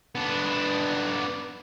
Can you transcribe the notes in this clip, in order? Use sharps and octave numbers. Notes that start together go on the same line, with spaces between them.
B3 D4